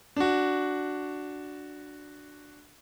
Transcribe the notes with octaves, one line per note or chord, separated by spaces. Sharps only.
D4 F#4